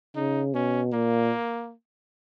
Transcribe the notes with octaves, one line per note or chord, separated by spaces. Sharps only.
C#3 D#4
B2 C#4
A#2 A#3